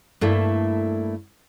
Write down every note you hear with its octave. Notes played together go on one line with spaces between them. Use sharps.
G2 A3 A#3 E4